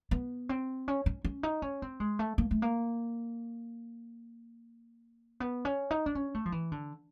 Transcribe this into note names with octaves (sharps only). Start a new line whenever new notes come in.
B3
C4
C#4
C#4
C#4
D#4
C#4
C4
G#3
A3
A#3
A3
A#3
B3
C#4
D#4
D4
C#4
A3
F3
E3
D3